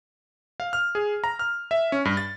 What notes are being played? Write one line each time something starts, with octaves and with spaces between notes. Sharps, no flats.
F5
F6
G#4
A#5
F6
E5
C#4
G2
A6